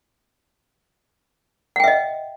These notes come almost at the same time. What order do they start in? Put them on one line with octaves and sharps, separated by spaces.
F#5 G5 E5 D#5